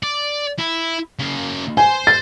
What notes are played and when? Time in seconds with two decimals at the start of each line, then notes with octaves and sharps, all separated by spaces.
0.03 D5
0.59 E4
1.19 C#3 A#3
1.77 C5 G#5
2.07 A6